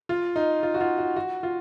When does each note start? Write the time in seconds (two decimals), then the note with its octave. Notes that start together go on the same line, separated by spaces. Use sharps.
0.09 F4
0.36 D#4
0.63 F4
0.74 F#4
0.81 F4
0.98 F#4
1.16 F#4
1.43 F4